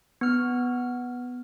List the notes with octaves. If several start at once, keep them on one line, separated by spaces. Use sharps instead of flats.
B3 F6